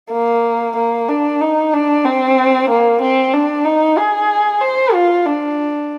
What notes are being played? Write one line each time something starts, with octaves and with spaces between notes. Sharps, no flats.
A#3
A#3
D4
D#4
D4
C4
A#3
C4
D4
D#4
G#4
C5
F4
D4